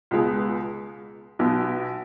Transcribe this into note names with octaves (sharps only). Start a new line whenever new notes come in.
C#2 B2 G#3 B3
B1 B2 B3